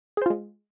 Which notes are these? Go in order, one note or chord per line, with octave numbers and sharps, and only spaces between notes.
G#3 F4 G#4 C5